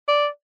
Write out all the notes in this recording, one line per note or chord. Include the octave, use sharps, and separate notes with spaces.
D5